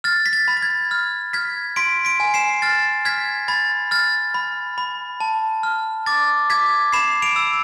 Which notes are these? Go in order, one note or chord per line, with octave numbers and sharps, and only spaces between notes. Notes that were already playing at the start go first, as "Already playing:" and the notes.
F6 A6
B6
A6
B5
A6
G#6
F6
F6 G#6 B6
C6 B6 D7
B6 D7
G#5
C7 E7
F6 A6
F6 G#6 B6
B5 A6
F6 A6
B5
B5
A5
F6
D6 A6
D6 G#6 B6
B5 C7 E7
D7 F7
E6